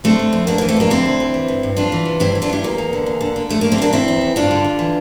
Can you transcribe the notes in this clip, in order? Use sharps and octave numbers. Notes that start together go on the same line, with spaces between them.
D3 A3 C4
D3
F2
E3 A#3 D4
E3 A#3
A3 C4
F2 A#3 D4
D3 C4 E4
D2
D2
E3
G2
G2
E3 D4 F4
E3
C3
G2 C4 E4
E3
D4 F4
G2 E4 G4
E2 A#3
E2
D3
E2
D3
D3
F2 A3
D3 A#3
A3 C4
D3 A#3 D4
E2 C4 E4
E2
E2
G2 D4 F4
D3
D3
E3